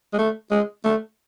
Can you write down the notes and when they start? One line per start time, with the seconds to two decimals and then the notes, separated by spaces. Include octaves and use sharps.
0.13 G#3
0.18 A3
0.51 G#3
0.84 A3